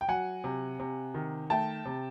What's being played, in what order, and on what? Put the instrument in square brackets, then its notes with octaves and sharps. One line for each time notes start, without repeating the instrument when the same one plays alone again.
[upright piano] G5
F#3 F#5 G#5
C3
C3
D#3
A3 G5 A5
C3